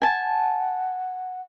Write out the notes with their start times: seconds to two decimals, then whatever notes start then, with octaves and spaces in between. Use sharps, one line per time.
0.02 F#5 G#5 A5